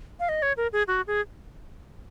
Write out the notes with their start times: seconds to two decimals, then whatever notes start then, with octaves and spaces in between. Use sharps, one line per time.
0.20 F5
0.29 D#5
0.42 C#5
0.57 A#4
0.73 G#4
0.88 F#4
1.07 G#4